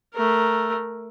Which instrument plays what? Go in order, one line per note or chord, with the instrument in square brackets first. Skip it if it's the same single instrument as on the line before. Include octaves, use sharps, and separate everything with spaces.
[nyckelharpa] A3 A#4